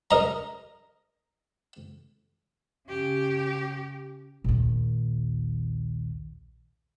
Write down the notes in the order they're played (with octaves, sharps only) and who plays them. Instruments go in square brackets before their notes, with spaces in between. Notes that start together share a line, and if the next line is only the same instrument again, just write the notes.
[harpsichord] A#4 D#5 A#5
[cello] C#3 G4
[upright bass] A#1 D#2